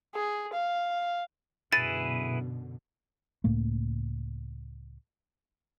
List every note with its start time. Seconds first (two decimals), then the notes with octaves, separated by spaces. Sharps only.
0.15 G#4
0.53 F5
1.72 F#2 B2 D3 E4 G#4 B4 A6
3.44 C#2 A2 A3 A#3